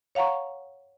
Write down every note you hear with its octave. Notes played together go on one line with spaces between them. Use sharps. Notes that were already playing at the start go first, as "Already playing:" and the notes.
C#5 F5 F#5 A#5 C#6